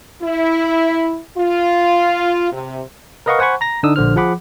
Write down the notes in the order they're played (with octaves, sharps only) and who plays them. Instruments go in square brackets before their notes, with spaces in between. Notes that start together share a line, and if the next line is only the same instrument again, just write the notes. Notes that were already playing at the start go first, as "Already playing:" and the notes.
[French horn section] E4
F4
C3
[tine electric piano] A#4 B4 D#5 F5 F#5 C#6
C5 F#5 G#5 B5 C#6
A#5 A#6
D3 D4 D#4 D#6 E6
A#1 D3 C5 F6
F3 G#4 F#5 B5 D6